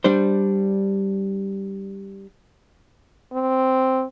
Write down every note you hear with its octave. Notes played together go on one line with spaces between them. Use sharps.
G3 D4 C5
C4